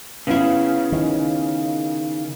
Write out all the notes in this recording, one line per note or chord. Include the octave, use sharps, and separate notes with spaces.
C#3 B3 E4
D#3